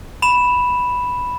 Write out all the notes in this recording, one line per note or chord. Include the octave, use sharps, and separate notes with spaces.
B5 E7 F7